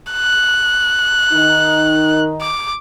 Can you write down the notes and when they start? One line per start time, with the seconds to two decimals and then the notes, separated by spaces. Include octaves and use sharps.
0.12 F#6
1.32 D#3 D#4
2.41 D6